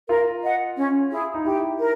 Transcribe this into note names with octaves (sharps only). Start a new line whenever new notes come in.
F4 A#4
D#5 F#5
C#4
E4 G#4
D#4
E4 G4
A#4